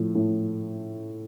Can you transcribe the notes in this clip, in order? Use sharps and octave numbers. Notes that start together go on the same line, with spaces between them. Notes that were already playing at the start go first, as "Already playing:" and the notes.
Already playing: A2 F3
A2